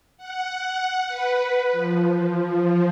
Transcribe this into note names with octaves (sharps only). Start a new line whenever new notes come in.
F#5
B4
F3